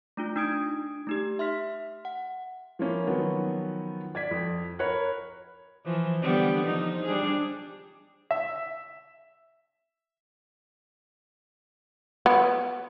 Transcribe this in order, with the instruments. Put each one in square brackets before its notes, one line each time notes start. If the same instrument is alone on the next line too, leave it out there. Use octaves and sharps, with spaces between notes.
[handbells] A3 D4 F4
D4 D#4 D#6 G#6 D7
A3 D#4 G4
E5 C6 F6 B6
F#5
[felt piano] F3 A#3 C#4 E4
D#3 F3 F#3 B3 C#4
D5 G#6 B6
F2
A#4 C#5 B5 F#6
[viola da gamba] E3 F3
D3 G3 B3
F3 D#4
G3 D4 G#4
[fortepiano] E5
[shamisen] B3